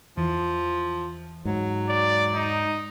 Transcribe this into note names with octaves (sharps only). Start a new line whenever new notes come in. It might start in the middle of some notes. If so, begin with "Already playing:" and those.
E2 E3 F3
G#2 F#3
D5
D#4